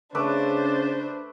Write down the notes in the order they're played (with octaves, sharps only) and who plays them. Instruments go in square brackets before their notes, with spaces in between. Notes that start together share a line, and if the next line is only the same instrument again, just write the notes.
[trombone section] C#3 [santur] A3 B4 D6 [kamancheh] D4 C5